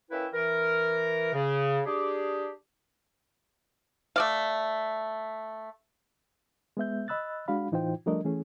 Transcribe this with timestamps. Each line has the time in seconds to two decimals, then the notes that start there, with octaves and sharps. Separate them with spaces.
0.11 A#3 C#4 E4 B4 E5 G5
0.33 E3 A#4
1.34 C#3
1.86 D4 G4 G#4
4.16 A3 D5 F5
6.77 G#3 B3 E5 G6
7.08 D#5 B5 E6 F#6 A6
7.48 G#3 D4 F#4 F5 B5
7.72 A2 E3 D#4 F4 C5 G5
8.06 F3 G3 A3 D4 A#4 D#5
8.24 E3 A3 C#4 G#4